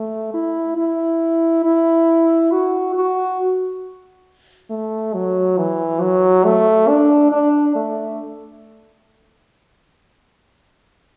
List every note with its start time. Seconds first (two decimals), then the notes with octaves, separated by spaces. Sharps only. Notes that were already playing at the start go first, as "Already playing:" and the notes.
Already playing: A3
0.34 E4
0.77 E4
1.65 E4
2.52 F#4
2.96 F#4
4.70 A3
5.14 F#3
5.58 E3
6.01 F#3
6.45 A3
6.89 D4
7.32 D4
7.75 A3